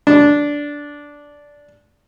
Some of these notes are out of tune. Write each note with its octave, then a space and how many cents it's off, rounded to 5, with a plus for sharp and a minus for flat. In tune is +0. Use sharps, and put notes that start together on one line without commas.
D4 -10